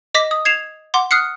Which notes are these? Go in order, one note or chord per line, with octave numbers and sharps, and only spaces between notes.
D#5 D6 A#6 B6
D#6
G#6 C7 E7 F7
F#5 C6 D6
D#6 F6 F#6 C7 C#7